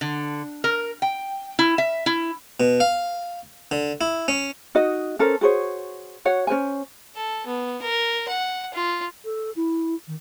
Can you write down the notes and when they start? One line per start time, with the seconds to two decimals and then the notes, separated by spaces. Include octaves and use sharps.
0.01 D3
0.64 A#4
1.02 G5
1.59 E4
1.78 E5
2.06 E4
2.60 B2
2.80 F5
3.71 D3
4.01 E4
4.28 C#4
4.75 D#4 F#4 D#5
5.19 C#4 A4 A#4 C5
5.41 F#4 G#4 C5 C#5
6.25 F#4 C#5 F#5
6.47 C#4 A#4 C5 G#5
7.15 A4
7.46 B3
7.82 A#4
8.28 F#5
8.74 F4
9.25 A4
9.56 E4
10.07 D#3